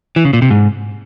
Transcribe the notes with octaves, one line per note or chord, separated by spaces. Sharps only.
E3
C#3
A#2
C3
G#2